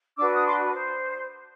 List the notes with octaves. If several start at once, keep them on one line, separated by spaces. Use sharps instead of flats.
D4 F#4 B4 D6 E6
D#6
C6 D6
C5